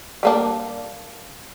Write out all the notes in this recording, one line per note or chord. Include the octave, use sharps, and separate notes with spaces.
G3 A#3 D4